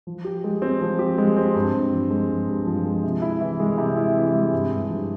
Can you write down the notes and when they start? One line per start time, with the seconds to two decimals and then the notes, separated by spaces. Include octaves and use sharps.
0.07 F3
0.25 G4
0.44 G#3
0.62 C4
0.81 F3
0.99 G4
1.18 G#3
1.36 C4
1.55 G2
1.74 G2
1.92 F3
2.11 G#3
2.30 G2
2.49 G2
2.67 F3
2.85 G#3
3.04 C3
3.22 E4
3.41 E3
3.60 G#3
3.78 C3
3.97 E4
4.16 E3
4.34 G#3
4.53 G2
4.72 G2
4.89 F3